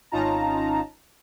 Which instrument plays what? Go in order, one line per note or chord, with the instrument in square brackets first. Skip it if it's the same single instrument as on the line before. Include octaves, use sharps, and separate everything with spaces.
[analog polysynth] G#1 C#4 D#4 F4 A5 A#5